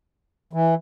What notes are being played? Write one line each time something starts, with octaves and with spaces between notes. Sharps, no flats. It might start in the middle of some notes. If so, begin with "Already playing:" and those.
E3